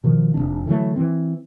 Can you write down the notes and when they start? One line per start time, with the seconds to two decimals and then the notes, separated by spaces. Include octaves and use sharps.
0.04 B2 D#3 F3
0.34 F1 B1 C3 D4
0.66 D3 E3 F#3 A3
0.96 E3 C4